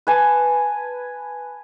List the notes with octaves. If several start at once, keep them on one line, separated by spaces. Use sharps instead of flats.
B4 G#5 A5